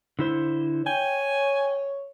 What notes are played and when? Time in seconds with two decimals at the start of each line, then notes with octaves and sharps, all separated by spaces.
0.19 D3 E4 C5
0.87 C#5 G5 G#5